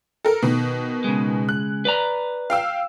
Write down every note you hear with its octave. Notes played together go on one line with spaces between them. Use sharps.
A4 A#4
B2 D#3
C#3 G#3
F#6
B4 D5 A#5
F5 G5 E6